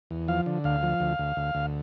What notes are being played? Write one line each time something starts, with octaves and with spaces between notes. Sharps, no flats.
E2
F3 F5
D3
D2 F5
F3
D2
D2
D2
D2